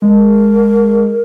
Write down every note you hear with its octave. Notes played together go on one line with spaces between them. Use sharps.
G#3 A#4